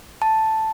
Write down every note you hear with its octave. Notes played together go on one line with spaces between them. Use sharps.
A5